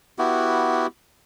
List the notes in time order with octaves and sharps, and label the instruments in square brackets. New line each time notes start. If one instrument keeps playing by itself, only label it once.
[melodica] B3 E4 F#4 G4